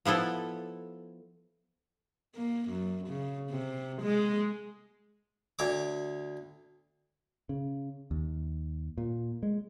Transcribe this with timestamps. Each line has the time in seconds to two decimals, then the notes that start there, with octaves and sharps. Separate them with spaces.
0.05 F3 B3 E4 A4
2.35 A#3
2.69 F#2
3.07 C#3
3.50 C3
4.02 G#3
5.59 D2 C#5 D6
7.49 C#3
8.11 D#2
8.98 A#2
9.43 G#3